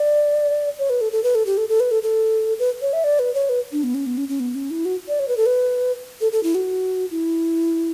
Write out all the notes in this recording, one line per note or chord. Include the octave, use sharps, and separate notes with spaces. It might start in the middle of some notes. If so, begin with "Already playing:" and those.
Already playing: D5
C#5
B4
A4
A4
B4
A4
G4
A4
A4
B4
A4
A4
B4
C#5
E5
D5
B4
C#5
B4
D4
B3
C#4
B3
C#4
C#4
B3
C#4
E4
F#4
D5
C#5
B4
A4
B4
A4
A4
E4
F#4
E4